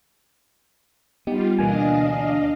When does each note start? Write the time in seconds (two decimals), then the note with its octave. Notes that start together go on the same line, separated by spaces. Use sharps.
1.27 G3 B3 D#4 F4 G4
1.59 D2 B2 E3 A#3 D4 D#5 F5 G#5